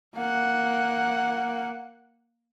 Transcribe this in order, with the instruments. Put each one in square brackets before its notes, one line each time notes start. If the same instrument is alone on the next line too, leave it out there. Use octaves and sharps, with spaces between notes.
[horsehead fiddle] A#3 F#5